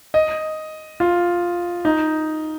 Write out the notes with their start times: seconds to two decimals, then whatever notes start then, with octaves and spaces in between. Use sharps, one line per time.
0.14 D#5
1.00 F4
1.85 D#4